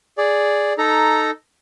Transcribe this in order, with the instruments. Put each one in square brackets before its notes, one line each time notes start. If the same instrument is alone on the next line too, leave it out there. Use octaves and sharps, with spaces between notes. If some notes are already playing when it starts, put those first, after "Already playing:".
[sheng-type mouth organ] G#4 D5
D#4 A4 A#5